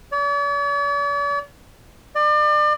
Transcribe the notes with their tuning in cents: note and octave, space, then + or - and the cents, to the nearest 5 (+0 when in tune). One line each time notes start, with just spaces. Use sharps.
D5 -45
D5 +35